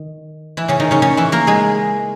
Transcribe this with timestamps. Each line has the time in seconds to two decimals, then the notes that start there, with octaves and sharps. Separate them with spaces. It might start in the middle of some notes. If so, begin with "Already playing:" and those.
Already playing: D#3
0.57 E3 E4
0.68 C#3 C#4
0.80 D#3 D#4
0.91 C#3 C#4
1.02 C#3 C#4
1.17 E3 E4
1.32 A#3 A#4
1.47 G#3 G#4